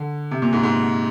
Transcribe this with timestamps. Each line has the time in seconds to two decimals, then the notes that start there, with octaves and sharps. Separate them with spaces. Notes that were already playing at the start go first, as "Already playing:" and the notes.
Already playing: D3
0.31 C3
0.42 A#2
0.53 G#2
0.63 G#2